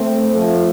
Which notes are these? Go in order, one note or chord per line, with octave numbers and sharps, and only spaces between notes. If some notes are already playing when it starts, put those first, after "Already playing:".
Already playing: A3 C4
F3 A3